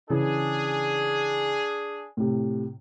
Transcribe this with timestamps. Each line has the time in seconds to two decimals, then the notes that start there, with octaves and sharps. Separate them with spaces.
0.10 C#3 E3 D4 G#4
2.17 A2 C3